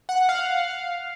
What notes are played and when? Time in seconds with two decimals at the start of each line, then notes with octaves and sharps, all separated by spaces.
0.09 F#5
0.29 F5
0.68 F5